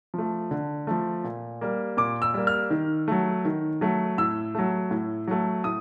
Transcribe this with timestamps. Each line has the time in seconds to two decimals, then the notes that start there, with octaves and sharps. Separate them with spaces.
0.14 F3 A3
0.51 D3
0.87 F3 A3
1.24 A#2
1.61 G3 A#3
1.97 A#2 D6
2.22 E6
2.34 G3 A#3
2.47 F6
2.70 D#3
3.08 F#3 A3
3.45 D#3
3.81 F#3 A3
4.18 A2 E6
4.55 F#3 A3
4.91 A2
5.28 F#3 A3
5.64 A2 D#6